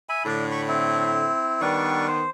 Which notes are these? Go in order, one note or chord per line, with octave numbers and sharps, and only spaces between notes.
E5 G#5 B5
A2 D3 D4
B5 C#6
C4 E4
D#3 G3 B3 D4 C#6
C5